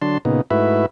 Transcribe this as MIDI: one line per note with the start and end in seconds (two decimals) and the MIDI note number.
0.02 0.18 50
0.02 0.18 54
0.02 0.18 62
0.02 0.18 81
0.02 0.18 84
0.25 0.41 46
0.25 0.41 49
0.25 0.41 59
0.25 0.41 63
0.50 0.86 44
0.50 0.86 57
0.50 0.86 64
0.50 0.86 66
0.50 0.86 71
0.50 0.86 76